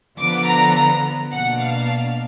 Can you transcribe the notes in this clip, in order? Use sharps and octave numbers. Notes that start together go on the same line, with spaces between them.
D3 F3 B3 D6
A#5
A#5
B2 A#3 D4 F#5
F5